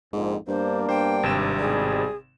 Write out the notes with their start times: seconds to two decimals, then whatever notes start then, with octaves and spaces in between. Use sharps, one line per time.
0.13 A#1 F2 G#2
0.47 G2 A#3 B3 D4 C5
0.89 G2 C5 G5
1.23 G#1 C3 E7
1.59 G#2 B2 G3 G#4